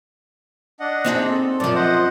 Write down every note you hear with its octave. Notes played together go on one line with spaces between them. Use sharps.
D4 D#5 F#5
C4 D#4 G#4
A4
F#2 F3 D5
C5 D#5 F#5